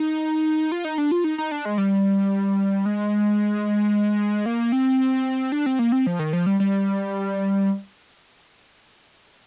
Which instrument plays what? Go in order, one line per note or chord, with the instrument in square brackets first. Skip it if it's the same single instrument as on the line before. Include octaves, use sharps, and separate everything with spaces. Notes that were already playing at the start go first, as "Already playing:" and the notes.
Already playing: [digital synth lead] D#4
F4
D#4
D4
F4
D#4
D#4
D4
G#3
G3
G#3
A#3
C4
D4
C4
A#3
C4
F3
D#3
F3
G3
G3